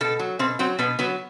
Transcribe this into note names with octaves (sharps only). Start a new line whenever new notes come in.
B2 A4
F#3
B2 C4
F#3 C4
B2 B3
F#3 B3